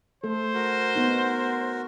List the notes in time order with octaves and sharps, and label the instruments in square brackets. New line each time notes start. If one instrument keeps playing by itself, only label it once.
[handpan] A3 A4 [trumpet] C5
[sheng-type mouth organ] F#4 A#4
[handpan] B3 D#4